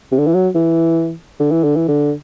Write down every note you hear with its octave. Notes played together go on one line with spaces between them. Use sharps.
C3
D3
E3
F#3
E3
D3
E3
D3
E3
D3